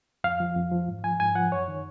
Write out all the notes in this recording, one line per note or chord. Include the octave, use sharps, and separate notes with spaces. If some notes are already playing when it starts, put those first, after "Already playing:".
F2 F5
F3
F2
F3
G#2
F3 G#5
G#2 G#5
F3 F#5
F#2 C#5
D#3